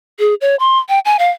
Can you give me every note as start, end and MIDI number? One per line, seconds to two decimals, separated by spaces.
0.19 0.35 68
0.41 0.56 73
0.60 0.78 84
0.89 0.99 79
1.05 1.17 80
1.19 1.30 77